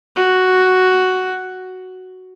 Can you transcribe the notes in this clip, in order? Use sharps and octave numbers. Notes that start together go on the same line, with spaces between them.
F#4